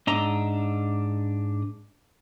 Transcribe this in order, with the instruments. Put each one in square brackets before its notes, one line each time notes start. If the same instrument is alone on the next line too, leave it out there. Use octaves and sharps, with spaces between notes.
[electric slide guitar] G#2 D4 D#5 E5 A#5